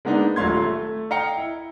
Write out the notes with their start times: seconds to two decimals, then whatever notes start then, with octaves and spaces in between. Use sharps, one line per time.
0.05 G#3 A#3 B3 D4 D#4
0.36 D#1 F#3 A3 F5 C6 G#6
0.62 A3
1.10 D#5 F5 G5 A#5 C#7
1.37 E4